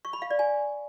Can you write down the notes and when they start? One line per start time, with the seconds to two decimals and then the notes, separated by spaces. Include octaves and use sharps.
0.05 C#6
0.13 B5
0.22 F5
0.30 D5
0.39 G#5